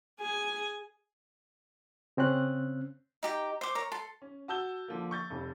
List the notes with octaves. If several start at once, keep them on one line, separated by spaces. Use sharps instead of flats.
G#4 G#5
C#3 C4 C#4 F#6
D#4 G4 G5
C5 D6
A#4 C#5
A4 C6
C#4
F#4 A5 E6 G6 G7
D3 F3 A#3
C#6 G6 A6
F1 F2